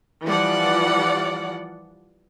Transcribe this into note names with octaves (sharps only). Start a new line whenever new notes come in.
E3 F3 G3 D5 F#5